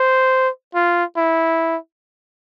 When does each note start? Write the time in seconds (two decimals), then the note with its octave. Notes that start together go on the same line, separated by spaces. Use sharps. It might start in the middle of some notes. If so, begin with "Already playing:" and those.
Already playing: C5
0.75 F4
1.17 E4